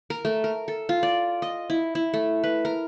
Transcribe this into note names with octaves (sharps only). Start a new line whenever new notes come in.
A#4
A3
A#4
A4
F4
D5
D#5
E4
E4
A3
B4
A#4